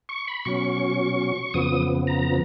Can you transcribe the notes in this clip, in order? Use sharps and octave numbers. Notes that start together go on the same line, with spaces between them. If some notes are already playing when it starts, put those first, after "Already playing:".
C#6
B5
B2 F#3 C#4 C#6
F2 C#3 F3 B3 D#6
A#5